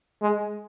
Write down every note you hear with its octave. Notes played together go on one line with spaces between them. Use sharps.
G#3